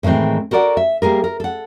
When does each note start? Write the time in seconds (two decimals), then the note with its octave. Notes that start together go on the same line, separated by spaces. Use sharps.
0.03 A2 D#3 E3 G#3 C4
0.51 F#4 A4 A#4 D5 F#5
0.77 E5
1.02 G3 A#3 G#4 A#4
1.24 A#4
1.40 A4 F#5